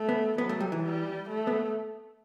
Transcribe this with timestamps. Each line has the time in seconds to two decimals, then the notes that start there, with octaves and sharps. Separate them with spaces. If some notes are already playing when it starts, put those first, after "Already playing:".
Already playing: A3
0.09 B3
0.38 F#3 B3
0.49 A3
0.60 G3
0.72 E3
0.83 G3
1.29 A3
1.47 B3